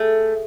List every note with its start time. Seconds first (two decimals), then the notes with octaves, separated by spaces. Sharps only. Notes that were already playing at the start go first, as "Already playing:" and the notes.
Already playing: A3 G#4